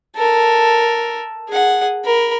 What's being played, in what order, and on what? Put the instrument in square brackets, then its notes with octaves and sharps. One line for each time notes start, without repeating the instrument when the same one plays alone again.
[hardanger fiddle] A4 A#4
G#4 F#5
A#4 B5